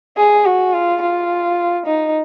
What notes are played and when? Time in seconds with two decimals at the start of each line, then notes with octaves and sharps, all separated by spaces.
0.17 G#4
0.46 F#4
0.74 F4
1.02 F4
1.86 D#4